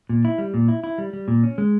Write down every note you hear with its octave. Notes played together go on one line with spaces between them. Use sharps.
A#2
E4
G3
A#2
E4
E4
G3
G3
A#2
C#4
G#3